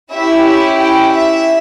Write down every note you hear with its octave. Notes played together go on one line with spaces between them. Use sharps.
C#4 E4 G4 E5
E5
G5
E5